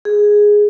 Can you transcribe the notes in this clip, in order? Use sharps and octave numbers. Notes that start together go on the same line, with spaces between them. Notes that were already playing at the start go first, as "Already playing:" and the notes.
G#4